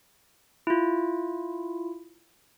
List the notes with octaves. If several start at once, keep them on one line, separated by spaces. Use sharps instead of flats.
E4 F4